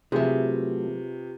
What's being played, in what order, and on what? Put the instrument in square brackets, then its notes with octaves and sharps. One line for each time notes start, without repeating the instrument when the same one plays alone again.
[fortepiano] C3 [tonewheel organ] F#3 A3 [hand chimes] F4 G4 B4 [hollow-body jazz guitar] G#4 E5